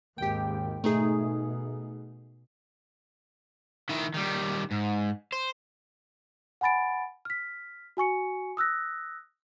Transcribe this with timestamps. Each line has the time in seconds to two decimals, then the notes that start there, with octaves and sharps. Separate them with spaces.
0.18 G#1 D#2 G4 G5
0.84 B2 A3 D#4 G#4
3.89 D#3 E4
4.14 D#3 G3
4.71 G#2
5.32 C5
6.61 F#5 G#5 B5 A6 D7
7.25 F6 B6
7.97 F#4 G#5 C#6 C#7
8.57 D#6 E6 F#6 A#6